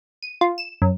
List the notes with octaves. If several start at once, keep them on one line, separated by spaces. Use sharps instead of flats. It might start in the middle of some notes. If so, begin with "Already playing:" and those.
D#7
F4
E7
F#2